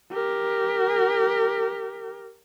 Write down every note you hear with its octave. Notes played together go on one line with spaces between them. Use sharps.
G4 A#4